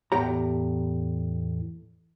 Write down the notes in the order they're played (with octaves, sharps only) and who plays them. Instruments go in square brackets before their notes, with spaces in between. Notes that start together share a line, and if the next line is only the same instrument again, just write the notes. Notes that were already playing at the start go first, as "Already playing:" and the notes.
[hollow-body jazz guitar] E2 A2 G4 A#5